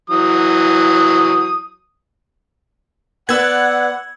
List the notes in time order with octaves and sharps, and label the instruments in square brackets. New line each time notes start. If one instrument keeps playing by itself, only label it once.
[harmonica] E3 F#3 D#6
[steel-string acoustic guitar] B3 B4 D5 [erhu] F#5 [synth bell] E6 G#6